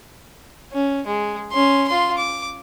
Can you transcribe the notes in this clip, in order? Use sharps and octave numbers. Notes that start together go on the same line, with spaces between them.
C#4
G#3
C#4 C6
F4 C6
D6